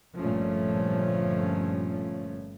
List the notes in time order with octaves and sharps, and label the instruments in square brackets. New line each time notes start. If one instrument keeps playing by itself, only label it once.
[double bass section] G1 G2 A#2 F3 A3 C#4